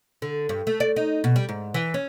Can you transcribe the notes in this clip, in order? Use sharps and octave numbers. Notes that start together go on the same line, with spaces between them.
D3
G2
A3
D5
D#4
B2
G3
G#2
E3
C#4